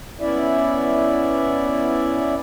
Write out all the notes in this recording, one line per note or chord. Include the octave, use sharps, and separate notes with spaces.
B3 C#4 E4 D5 E5